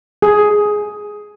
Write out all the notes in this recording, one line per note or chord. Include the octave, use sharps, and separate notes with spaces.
G#4